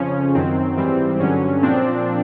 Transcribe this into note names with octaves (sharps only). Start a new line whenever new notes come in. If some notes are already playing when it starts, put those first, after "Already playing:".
Already playing: F2 C#3 F3 C#4
F#2 D#3 F#3 C4
G#2 E3 G3 C4
G2 D3 F#3 C#4
A#2 F3 C4 D4